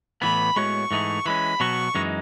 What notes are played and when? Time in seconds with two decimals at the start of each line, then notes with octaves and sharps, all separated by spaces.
0.22 A2 E3 B3 B5
0.56 A2 G#3 B3 F#4 C#5 C#6
0.91 G#2 E3 A3 D#4 G#4
1.26 E3 G#3 C#4 B5
1.60 B2 F#3 B3 F#4 C#6
1.95 F#2 E3 G#3 D#4